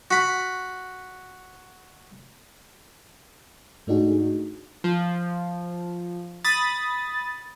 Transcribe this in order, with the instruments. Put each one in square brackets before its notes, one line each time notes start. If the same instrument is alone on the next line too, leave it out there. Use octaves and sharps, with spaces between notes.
[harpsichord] F#4 B5
[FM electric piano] G#2 A3 D4 D#4 F#4 G#4
[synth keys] F3
B5 D#6 A6